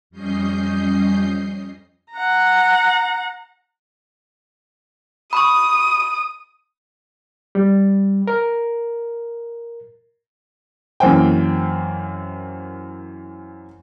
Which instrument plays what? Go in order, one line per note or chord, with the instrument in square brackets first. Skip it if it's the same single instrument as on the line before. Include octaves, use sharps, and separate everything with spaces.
[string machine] F2 G3 C#4 D#5 G6 C7
[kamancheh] F#5 A#5
[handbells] B5 C#6 [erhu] D#6
[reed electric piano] G3
A#4
[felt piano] F#2 E3 A#3 C4 G5